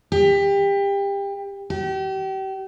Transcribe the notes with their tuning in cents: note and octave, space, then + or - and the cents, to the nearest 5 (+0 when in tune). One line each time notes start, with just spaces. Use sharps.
G4 +25
G4 -35